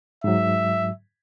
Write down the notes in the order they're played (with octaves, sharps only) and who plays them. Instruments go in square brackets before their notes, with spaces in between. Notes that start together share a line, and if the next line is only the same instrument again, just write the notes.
[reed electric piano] G#2 F#3 [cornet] E5